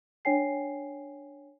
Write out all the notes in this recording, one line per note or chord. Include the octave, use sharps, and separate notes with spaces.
D4 C#5 G5 G#5 C7